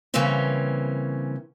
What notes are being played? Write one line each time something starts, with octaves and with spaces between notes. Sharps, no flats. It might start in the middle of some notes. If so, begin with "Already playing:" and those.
C#3 E3 G3 A#3 C4 C#4